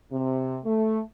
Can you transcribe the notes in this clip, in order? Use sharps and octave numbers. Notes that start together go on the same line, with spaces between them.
C3
A3